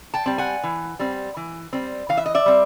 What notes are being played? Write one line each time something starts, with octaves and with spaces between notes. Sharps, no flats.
G5 A5
G3 C4
F#5 G#5
E3
G3 C4
E3
G3 C4
E3 F5
E5
D#5
D5 E5
G3 C4